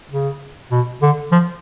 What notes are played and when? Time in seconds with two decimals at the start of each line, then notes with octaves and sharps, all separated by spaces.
0.11 C#3
0.71 B2
1.02 D3
1.32 F3